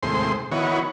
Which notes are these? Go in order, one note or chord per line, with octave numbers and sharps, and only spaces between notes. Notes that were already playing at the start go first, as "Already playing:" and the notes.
D#2 A2 C3 G#3 C5 C6
D#3 E3 B3 F#4 C#5